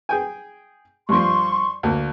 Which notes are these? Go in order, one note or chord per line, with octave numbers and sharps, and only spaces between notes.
G#4 G5 G#5
G2 F3 C6 C#6
D2 A#3